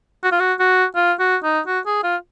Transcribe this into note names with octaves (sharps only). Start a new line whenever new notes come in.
F#4
F4
F#4
F#4
F4
F#4
D#4
F#4
G#4
F4